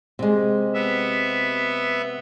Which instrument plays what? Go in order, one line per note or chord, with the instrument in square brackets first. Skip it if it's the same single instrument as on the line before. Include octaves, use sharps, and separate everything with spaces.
[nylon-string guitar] C3 G#3
[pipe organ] B3 E5